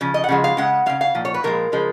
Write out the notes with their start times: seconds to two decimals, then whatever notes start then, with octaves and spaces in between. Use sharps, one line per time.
0.01 C#3 F3
0.14 D#5
0.24 F#5
0.29 C#3 F3 G#3
0.44 F5
0.57 C#3 G#3 F#5
0.86 C#3 G#3 F5
1.01 F5
1.15 A#2 F3
1.25 C#5
1.34 B4
1.43 A#2 F3 G#3 A#4
1.72 C#3 F3 G#3